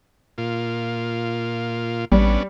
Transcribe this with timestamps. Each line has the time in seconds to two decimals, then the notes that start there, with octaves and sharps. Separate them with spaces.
0.38 A#2 F4
2.12 A1 G3 B3 C#4 D4